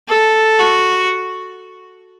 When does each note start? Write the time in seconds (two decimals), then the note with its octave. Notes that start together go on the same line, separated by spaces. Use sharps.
0.08 A4
0.59 F#4